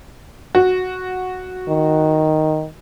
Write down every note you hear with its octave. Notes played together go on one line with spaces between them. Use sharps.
F#4
D#3